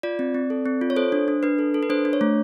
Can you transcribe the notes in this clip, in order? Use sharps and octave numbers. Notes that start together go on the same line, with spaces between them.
F4 D5
C4
C4
A4
C4
F4
C#5
A4 C5
D4
D4
D4 B4
A4
A4
B4
D4 C5
D4
C#5
A3